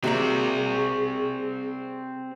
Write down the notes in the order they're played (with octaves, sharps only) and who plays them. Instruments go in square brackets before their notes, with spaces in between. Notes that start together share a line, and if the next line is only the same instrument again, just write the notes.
[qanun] C3 A#3 E5 [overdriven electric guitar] C4 D5 [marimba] F#4 [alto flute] G#4